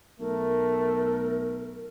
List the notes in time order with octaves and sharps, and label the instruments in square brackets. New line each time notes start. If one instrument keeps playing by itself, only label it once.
[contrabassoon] B1 [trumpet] A3 [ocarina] A#4